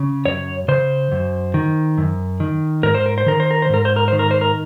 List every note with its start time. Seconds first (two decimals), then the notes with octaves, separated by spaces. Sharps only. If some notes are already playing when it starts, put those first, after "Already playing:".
Already playing: C#3
0.25 F#2 C#5
0.68 C#3 C5
1.12 F#2
1.54 D#3
1.98 F#2
2.40 D#3
2.83 G#2 A#4
2.95 C5
3.06 A#4
3.18 C5
3.26 D#3 A#4
3.40 C5
3.51 A#4
3.62 C5
3.69 G#2 A#4
3.85 C5
3.96 A#4
4.08 D#3 C5
4.19 A#4
4.31 C5
4.41 A#4